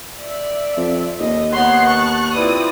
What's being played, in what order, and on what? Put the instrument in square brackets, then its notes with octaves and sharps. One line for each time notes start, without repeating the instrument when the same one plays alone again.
[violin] D5 [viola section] E5
[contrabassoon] F2
[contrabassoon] D#2 [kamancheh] D#5
[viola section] B3 D#4 C#5 [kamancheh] F#5 C6 [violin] F#6
[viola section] A5 [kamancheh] C#6
[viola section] C4 F4 D5 [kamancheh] E4 B4 [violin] D#6